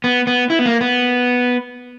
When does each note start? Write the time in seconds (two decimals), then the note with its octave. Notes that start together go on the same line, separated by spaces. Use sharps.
0.04 B3
0.27 B3
0.50 E4
0.59 B3
0.66 A#3
0.81 B3